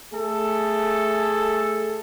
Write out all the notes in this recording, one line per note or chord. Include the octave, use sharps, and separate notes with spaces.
A3 G#4 A4